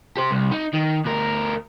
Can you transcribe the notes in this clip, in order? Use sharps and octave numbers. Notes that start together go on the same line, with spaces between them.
G4 C5
C2
D#4
D#3
D2 A#4